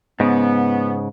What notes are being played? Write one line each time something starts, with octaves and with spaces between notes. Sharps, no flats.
G#2 C#3 B3